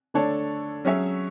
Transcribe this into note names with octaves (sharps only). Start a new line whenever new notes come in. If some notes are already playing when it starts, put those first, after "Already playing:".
D3 A3 D4 A4 C#5
F#3 C#4 G#4 C#5 E5